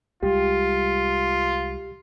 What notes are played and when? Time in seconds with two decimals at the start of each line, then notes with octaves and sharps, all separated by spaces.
0.23 C2 G3 G#3 F4 G4